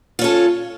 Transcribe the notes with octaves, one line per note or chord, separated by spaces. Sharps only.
C#4 F4 A4